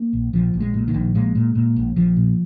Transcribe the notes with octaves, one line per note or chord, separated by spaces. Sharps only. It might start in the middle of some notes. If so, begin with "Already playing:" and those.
Already playing: A#3
A#1
A#1 F3
A#1
G#3
A#2
D#3
A#1
A#2 G#3
A#2
A#2
A#1
A#1 F3
A#2